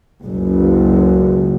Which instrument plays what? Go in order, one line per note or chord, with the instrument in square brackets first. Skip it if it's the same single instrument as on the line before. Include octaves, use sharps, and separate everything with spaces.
[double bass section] F#1 C#2